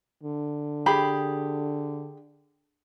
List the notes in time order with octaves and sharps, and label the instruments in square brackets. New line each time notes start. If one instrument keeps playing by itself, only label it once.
[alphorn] D3
[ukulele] G4 G#4 B5